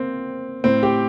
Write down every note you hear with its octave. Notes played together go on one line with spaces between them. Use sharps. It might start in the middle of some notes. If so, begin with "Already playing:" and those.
Already playing: A#3 C4
A2 C4
G4